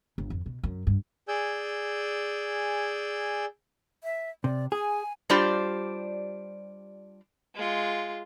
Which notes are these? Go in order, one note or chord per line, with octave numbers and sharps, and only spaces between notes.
G1
F2
B2
F#2
G2
G#4 D5 G#5 E6 G6
E5
C3 D5
G#4 G#5
G3 D4 F4 G4 C5 D5
G#3 F4